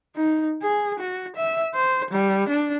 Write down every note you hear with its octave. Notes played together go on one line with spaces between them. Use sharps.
D#4
G#4
F#4
E5
C5
G3
D4